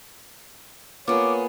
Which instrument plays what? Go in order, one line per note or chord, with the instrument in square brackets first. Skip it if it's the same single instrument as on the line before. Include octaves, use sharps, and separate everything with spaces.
[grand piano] A#3 F4 [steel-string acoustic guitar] B3 G#4 [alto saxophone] C#5 [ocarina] D6